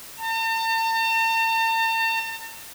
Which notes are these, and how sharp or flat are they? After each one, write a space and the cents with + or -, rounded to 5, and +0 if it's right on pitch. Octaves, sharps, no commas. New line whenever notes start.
A5 +45